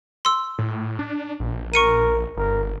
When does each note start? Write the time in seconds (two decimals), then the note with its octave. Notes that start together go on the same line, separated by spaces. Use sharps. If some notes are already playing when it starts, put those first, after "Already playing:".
0.25 C6 E6
0.59 A2
0.99 D4
1.40 A#1
1.74 A#4 C#6 C#7 D#7
2.37 G1 A#4